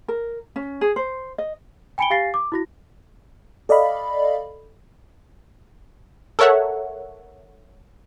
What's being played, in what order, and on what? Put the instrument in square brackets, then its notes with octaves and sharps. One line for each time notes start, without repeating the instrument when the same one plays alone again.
[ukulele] A#4
C#4
G#4
C5
D#5
[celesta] G5 G#5 B5 C#7 D7 G7
G4 F5 G#5 A6 A#6 C7
D6
E4 F#4 A#6
[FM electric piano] A4 D5 D#5 F5 B5
[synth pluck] A4 A#4 C#5 E5 F#5